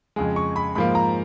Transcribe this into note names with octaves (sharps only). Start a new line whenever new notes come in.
F2 C#3 G#3
C#6
B5
G#2 F3 A#3 B5
A#5